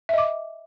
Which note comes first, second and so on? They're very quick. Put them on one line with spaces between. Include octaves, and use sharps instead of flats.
E5 D#5 D6